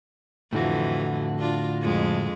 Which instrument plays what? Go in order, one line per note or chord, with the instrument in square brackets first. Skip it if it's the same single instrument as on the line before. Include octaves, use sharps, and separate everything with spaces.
[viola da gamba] F2 E3 [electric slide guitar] A2 D3 F#4
[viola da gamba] D4 F4
F2 G#3